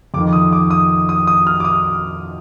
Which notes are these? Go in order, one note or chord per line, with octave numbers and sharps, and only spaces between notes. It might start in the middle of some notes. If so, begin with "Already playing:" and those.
F2 D6
D#3
D#6
D6
D#6
D#6
D#6
F6
D6
D#6